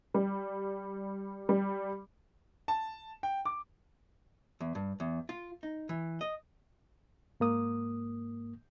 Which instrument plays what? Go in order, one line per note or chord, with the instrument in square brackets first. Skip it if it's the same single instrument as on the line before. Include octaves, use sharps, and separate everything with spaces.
[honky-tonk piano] G3
G3
[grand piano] A5
G5
D6
[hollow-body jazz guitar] E2
G2
E2
F4
D#4
E3
D#5
[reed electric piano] G#2 A#3 D#6